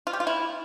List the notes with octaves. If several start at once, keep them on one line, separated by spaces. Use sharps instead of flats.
F4
G4
F4
E4